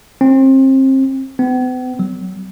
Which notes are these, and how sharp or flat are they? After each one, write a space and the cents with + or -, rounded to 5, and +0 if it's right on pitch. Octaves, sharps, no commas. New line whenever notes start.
C4 +30
B3 +45
F#3 +20